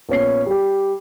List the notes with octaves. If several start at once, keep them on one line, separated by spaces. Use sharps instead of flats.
A#1 B3 C#4 C7
G3 G4